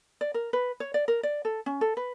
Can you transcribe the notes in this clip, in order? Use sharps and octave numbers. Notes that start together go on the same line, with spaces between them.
D5
A#4
B4
C#5
D5
A#4
D5
A4
C#4
A4
B4